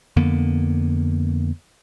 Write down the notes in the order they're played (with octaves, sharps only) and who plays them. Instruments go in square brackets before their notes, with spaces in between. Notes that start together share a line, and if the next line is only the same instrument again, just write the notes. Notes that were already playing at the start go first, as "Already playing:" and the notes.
[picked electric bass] F2 D3 A#3 B3